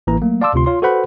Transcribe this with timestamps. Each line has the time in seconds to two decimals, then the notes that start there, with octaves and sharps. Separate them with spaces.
0.07 A1 E3 A#3 A#5
0.22 F#3 A3 A#3
0.42 D5 F5 A5 C6 D6 E6
0.54 D2 C3 F4 C6
0.66 F4 C#5 C6
0.82 F#4 A4 B4 C5 F#5 B5